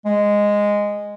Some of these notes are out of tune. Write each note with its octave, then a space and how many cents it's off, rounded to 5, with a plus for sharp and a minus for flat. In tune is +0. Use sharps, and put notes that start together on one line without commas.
G#3 -10